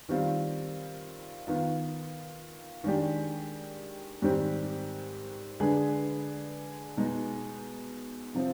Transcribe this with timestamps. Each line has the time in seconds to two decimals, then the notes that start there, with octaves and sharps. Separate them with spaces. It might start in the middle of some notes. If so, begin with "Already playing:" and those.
0.09 D#3 G3 C4 F4
1.47 D#3 B3 F4
2.84 D#3 G#3 D4 G4
4.22 G#2 D#3 G3 C4 G4
5.60 D3 G#3 D4 G#4 B4
6.97 B2 G#3 B3 D#4
8.34 C3 F3 C4